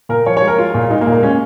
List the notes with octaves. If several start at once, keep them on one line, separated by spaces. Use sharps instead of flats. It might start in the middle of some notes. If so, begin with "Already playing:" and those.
A#2 A#4
F3 C#5
C#5
G#3
A#4
G#3 F4
A#2
G#3 D#4
A#3
A#2
A#3
G#3 C#4